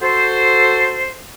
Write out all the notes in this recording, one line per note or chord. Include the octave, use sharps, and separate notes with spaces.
F#4 A4 C5